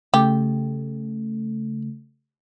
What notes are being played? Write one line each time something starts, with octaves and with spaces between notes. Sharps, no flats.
C#3 A3 G4